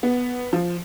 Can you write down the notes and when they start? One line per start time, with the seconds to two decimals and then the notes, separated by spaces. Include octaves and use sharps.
0.03 B3
0.53 F3